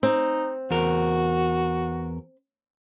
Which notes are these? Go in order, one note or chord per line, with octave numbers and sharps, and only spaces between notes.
C4 D#4
E2 F#4 A#4